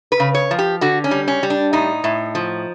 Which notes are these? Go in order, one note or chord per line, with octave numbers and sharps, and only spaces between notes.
B4
C#3
C#5
F3
G4
D3 F#4
C#4
G3
C#4
G3
D4
A2 D#4
A2
F3